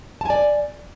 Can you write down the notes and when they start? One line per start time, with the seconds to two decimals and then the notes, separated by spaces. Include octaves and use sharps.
0.21 A5
0.26 G#5
0.30 D5